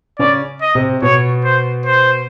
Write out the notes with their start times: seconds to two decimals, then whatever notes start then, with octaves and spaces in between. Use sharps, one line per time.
0.19 C#3 C#4 D5
0.62 D#5
0.75 C3 C4
1.02 B2 B3 C#5
1.44 C5
1.86 C5